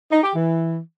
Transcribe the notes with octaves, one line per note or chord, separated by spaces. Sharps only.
D#4
G4
E3